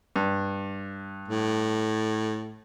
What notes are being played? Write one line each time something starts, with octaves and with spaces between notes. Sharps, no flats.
G2
A2